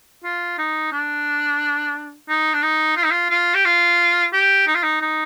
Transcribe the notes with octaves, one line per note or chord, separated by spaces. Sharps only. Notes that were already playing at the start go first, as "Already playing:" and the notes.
F4
D#4
D4
D#4
D4
D#4
F4
D#4
F4
F4
G4
F4
G4
D#4
F4
D#4
D#4